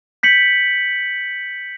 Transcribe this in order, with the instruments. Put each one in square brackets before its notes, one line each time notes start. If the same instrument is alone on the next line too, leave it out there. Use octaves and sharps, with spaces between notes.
[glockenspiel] G6 B6 C#7 F#7